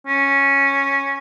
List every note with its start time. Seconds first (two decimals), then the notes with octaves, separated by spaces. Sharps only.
0.07 C#4